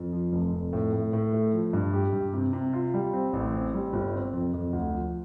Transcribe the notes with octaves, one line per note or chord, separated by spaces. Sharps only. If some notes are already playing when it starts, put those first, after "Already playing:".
Already playing: F2
F3
F1
F2
A2
A2
A2
A3
F3
G2
G4
G2
C3
C3
F4
G3
C4
A1
C4
G3
G1
C4
F2
F2
D2
F3